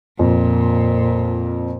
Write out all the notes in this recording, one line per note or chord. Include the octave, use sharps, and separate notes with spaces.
F2 A#2